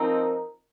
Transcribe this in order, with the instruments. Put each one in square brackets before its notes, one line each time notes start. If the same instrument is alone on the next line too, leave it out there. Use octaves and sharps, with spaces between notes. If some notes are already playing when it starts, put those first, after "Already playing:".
Already playing: [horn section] F3 C4 D#4 A#4